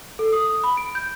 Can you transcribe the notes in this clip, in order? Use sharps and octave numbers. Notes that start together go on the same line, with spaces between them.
A4
D#6
B5
D7
G6